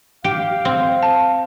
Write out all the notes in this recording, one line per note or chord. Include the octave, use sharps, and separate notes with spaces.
G4 F5
C4
A5